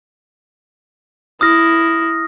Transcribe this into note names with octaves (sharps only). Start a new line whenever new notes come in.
E4 D#6 F6 A#6